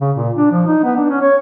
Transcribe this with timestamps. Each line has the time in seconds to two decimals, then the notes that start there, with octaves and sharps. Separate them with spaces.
0.01 C#3
0.16 A#2
0.37 D4
0.52 F3
0.67 D#4
0.84 B3
0.97 D4
1.09 C#4
1.21 C#5